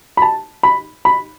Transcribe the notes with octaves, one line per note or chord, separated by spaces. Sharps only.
B5
A5
B5
B5